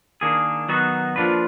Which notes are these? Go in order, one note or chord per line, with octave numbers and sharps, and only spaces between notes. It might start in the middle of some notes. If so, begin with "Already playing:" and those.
D#3 A#3 D4 G#4
D#3 F#3 B3 D#4 F#4
F3 A#3 D4 F4 B4